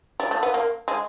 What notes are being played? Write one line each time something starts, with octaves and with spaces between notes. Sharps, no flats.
G3
A3
B3
A#3
G#3